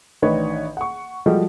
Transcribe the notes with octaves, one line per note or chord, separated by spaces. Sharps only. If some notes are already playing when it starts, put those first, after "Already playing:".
A1 D#3 D4 B4 C#5 D#5
F#5 C#6
F3 G3 G#3 F#4 A4 D#5